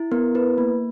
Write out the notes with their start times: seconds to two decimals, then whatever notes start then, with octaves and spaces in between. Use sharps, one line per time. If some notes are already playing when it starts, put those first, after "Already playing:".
Already playing: E4
0.12 B3 A#4
0.35 E4 B4
0.58 A#3